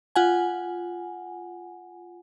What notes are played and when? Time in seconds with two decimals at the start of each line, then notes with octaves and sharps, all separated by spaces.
0.16 F4 F#5 G#5